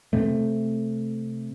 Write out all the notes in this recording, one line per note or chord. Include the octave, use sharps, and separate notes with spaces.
C3 A3